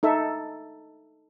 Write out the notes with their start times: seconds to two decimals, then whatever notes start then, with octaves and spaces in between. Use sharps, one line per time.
0.03 D#4 A4 E5